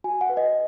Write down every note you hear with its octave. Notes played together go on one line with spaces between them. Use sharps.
F#4 G#5
F#5
B4
D#5